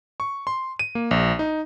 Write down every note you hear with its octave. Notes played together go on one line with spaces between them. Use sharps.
C#6
C6
D#7
A#3
A#1
D#4